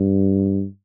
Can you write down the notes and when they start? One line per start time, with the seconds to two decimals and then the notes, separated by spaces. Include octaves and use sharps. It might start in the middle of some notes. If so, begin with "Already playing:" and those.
Already playing: G2